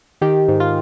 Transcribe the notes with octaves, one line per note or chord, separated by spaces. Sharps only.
D#3 G4
G#2
F4